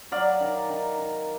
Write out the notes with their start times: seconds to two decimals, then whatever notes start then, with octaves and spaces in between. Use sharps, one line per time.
0.12 F#3 D5 F5
0.41 D#3
0.69 D#3
0.98 D#3